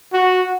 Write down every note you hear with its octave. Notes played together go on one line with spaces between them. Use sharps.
F#4